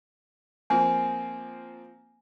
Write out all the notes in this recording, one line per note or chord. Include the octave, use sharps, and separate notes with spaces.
F3 A#3 C4 G#5